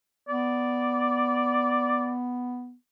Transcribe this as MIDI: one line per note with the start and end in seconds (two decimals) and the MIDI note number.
0.29 2.74 59
0.29 2.11 74